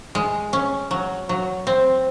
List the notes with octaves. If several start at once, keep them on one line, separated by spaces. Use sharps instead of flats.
G#3
C#4
F#3
F#3
C4